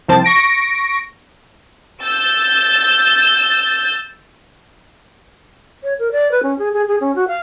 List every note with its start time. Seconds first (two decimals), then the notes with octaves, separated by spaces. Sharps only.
0.08 C2 F3 C4 A5
0.24 C#6 A#6 D7
2.02 E6 G6 A6
5.84 C#5
5.99 A#4
6.12 D5
6.32 B4
6.43 C#4
6.59 G#4
6.73 G#4
6.88 G#4
7.01 C#4
7.16 F#4
7.28 F5